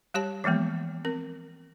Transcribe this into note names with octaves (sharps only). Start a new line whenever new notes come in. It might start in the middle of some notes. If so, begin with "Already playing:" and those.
G3 G4 C#5 A5
E3 F3 G#3 A#3 B3
C4 A#4